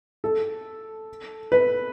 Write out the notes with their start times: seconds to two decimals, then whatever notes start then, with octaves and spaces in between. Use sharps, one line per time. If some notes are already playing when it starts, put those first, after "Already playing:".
0.24 A4
1.52 B4